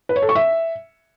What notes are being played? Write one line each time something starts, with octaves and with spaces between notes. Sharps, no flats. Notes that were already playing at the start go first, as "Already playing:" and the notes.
B4
C#5
A4
C#6
E5